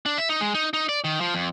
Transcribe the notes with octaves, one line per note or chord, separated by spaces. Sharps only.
D4
E5
D#4
G#3
D#4
D#4
D5
D#3
F3
F2